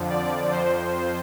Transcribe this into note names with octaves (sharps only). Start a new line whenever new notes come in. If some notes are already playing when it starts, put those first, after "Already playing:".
Already playing: F2 D3 F3
D5
F2 F3 C5